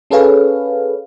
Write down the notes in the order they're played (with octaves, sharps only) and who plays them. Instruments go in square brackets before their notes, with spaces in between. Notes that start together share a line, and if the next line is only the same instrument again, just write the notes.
[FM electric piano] C#4 G#4 A4 B4 C#5 F5